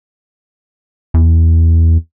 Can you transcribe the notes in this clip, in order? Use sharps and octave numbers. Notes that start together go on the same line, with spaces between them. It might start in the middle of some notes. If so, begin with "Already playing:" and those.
E2